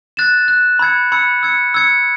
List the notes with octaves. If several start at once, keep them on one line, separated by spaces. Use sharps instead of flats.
F#6 A6 E7
F#6 A6 E7
B5 E6 G#6 C#7
B5 E6 G#6 C#7
E6 G#6 C#7
E6 G#6 C#7